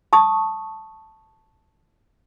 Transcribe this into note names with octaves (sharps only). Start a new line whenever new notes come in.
A5 C#6 D#6